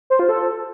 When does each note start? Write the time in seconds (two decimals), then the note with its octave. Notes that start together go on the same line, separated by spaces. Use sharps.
0.10 C5
0.19 F4
0.29 A4